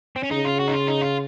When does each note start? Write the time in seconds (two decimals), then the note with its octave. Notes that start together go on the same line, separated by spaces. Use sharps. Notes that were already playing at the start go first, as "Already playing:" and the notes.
0.16 C4
0.23 C#4
0.31 C#3 D#4
0.45 F4
0.59 F#4
0.67 D#4
0.73 F4
0.87 D#4
1.02 F4